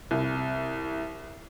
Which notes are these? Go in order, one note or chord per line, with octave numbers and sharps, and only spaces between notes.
C2